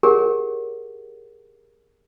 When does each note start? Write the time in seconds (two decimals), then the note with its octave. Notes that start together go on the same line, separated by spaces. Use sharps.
0.03 G4 G#4 A#4 C#5 F#5